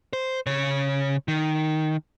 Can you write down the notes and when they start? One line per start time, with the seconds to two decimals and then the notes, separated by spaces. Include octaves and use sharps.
0.13 C5
0.47 C#3 C#5
1.28 D#3